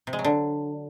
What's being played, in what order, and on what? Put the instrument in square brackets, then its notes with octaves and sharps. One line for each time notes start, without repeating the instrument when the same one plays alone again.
[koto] C3
G#3
F#3
D3